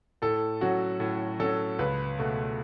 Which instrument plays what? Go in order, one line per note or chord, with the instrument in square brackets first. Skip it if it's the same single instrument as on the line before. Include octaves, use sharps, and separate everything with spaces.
[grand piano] A2 A4
F#3 C#4 F#4
A2
F#3 C#4 A4
C#2 B4
B2 A3